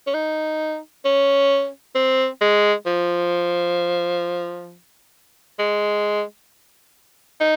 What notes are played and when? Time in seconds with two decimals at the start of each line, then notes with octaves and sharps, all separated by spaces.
0.07 C#4
0.14 D#4
1.05 C#4
1.95 C4
2.41 G#3
2.86 F3
5.59 G#3
7.40 D#4